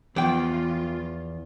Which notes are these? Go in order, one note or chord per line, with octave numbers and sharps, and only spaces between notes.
E2 E3 F3 F4 G5